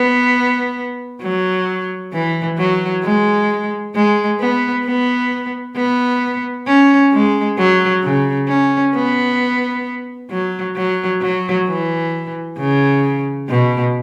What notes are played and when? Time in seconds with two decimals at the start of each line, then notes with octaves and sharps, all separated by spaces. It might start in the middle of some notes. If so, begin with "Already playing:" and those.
Already playing: B3
1.22 F#3
2.13 E3
2.58 F#3
3.04 G#3
3.95 G#3
4.40 B3
4.85 B3
5.76 B3
6.67 C#4
7.13 G#3
7.58 F#3
8.03 C#3
8.49 C#4
8.94 B3
10.31 F#3
10.76 F#3
11.21 F#3
11.67 E3
12.58 C#3
13.49 B2